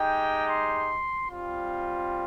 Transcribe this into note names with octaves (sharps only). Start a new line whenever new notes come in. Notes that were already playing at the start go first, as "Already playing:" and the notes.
Already playing: G#3 D#4 G4 G5
C6
G3 C4 F4